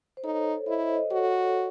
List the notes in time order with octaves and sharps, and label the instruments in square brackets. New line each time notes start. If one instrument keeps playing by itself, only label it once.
[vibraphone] C5
[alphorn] D#4 [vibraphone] A4 C#5
[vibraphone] A4 C#5
[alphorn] E4 [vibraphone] C5 D#5
[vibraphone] C5 D#5
C5 D#5
[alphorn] F#4 [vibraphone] A4 C#5